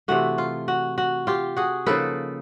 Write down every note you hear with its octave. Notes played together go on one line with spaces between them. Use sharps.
C3 E3 A3 F#4
F4
F#4
F#4
F4 G4
F#4 G#4
C#3 F3 A#3 D#4 A4 B4